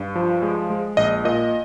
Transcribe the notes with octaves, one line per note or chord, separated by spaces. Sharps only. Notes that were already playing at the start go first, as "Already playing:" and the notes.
Already playing: G2
F3
G#3
G#3
A#1 D#5
A#2 D#5